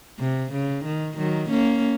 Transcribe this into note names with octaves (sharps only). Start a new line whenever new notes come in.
C3
C#3
D#3
D#3 F#3
A#3 C#4